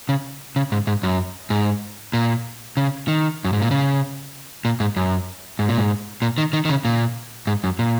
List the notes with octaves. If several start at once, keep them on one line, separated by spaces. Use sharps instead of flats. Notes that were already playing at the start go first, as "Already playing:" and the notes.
C#3
C#3
G#2
G#2
F#2
G#2
A#2
C#3
D#3
F#2
G#2
A#2
C#3
A#2
G#2
F#2
G#2
A#2
G#2
A#2
D#3
D#3
D#3
C#3
A#2
G#2
F#2
A#2